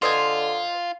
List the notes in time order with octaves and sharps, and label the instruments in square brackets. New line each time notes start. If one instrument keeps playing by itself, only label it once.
[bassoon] D3 [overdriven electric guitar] F4 [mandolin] C5 D#5 G#5